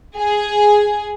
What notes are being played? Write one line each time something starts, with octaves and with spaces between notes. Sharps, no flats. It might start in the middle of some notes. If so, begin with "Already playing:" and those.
G#4